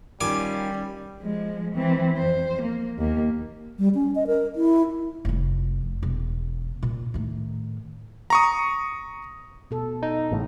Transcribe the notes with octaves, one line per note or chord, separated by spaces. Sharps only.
D#3 G3 C#4 F4 G#5 D6
F3 G#3
E3 C4
F2 C5
A#3
D#2 A#3
G3
C#4
D#5
A#4
E4
F1 F2
E1
A#2
A2 D#3
A#5 C#6 D#6
B2 A4
D#4
A1 A2 C#3